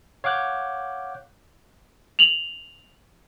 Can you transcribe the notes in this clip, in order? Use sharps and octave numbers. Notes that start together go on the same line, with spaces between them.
C#5 F5 F#5 D6 F#6 G6
F7 F#7